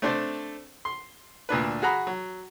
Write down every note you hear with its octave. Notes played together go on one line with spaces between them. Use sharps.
A3 C4 D4 C5 D5 A5
C6
D2 A#2 D4 B4
F#4 G#4 F#5 A#5 B5
F#3